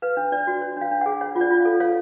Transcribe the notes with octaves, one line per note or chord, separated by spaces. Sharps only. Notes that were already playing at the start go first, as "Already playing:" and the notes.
B4 F5
D4
D4 D5
F#4
C#5
D4 F5
D4
G#4 F#5
C#5 F#5
F4
D5
F4
F5
A4
C#5 F5